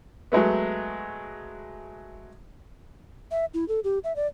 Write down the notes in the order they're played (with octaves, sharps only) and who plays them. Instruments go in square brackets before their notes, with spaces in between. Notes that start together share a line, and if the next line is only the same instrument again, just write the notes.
[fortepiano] F#3 G#3 A3 B3
[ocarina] E5
E4
A4
G4
E5
D5